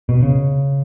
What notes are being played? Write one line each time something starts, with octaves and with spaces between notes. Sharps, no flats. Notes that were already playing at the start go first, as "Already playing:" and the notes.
B2
C#3